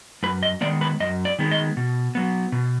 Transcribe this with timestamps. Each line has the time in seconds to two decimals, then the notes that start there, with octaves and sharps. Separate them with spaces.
0.23 F#2 B4
0.43 D#5
0.61 D#3 G#3 B3 D5
0.81 B4
1.00 F#2 D#5
1.25 D5
1.39 D#3 G#3 B3
1.51 D#5
1.77 B2
2.15 F#3 B3
2.52 B2